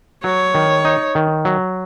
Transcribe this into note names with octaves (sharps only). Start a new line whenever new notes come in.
F#3 C#5
D#3
D#4
D#3
F#3